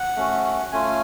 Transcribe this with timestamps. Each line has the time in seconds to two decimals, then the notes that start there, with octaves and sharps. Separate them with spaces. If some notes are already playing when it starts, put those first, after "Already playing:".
Already playing: F#5
0.16 A3 C#4 F#4
0.72 A3 C#4 F4 G#5